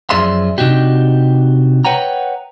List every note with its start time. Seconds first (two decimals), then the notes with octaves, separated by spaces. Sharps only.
0.10 F#2 F3 G#4 D5 E5 C6
0.58 C3 D4 D#4 F#4 G4
1.85 B4 C#5 F#5 G5 A#5